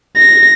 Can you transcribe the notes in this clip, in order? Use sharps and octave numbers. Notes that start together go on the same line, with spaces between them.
A#6